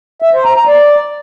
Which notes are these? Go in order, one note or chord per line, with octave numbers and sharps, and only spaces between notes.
E5
C5
A#5
A#5
D5